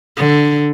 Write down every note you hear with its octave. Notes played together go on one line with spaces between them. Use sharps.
D3